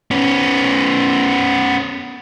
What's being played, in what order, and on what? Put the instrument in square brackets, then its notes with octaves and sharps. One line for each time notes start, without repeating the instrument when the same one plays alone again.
[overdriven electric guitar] B3 C#4